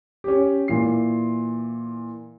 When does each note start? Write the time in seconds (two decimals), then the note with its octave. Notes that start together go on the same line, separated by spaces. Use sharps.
0.24 C#4 G4
0.68 A#2 E3 C7